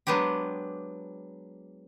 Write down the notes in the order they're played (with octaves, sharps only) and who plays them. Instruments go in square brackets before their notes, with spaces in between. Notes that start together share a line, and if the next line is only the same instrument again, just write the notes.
[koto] F#3 G#3 B3 D4 G4